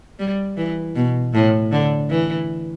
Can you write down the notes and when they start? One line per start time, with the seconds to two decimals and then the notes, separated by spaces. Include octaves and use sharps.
0.19 G3
0.57 E3
0.95 B2
1.34 A2
1.72 D3
2.10 E3